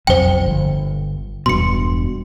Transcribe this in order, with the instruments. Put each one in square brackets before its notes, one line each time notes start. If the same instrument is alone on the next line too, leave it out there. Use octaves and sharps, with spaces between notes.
[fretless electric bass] F#1 B1 F2 [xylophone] C5 G5
[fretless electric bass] G1
[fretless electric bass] E1 G2 B2 [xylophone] C6 C#7